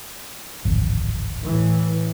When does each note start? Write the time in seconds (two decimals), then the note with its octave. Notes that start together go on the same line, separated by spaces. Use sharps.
0.65 D1 G#1 F2
1.44 A2 E3